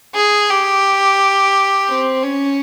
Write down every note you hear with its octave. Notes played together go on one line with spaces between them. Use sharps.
G#4
G4
C4
C#4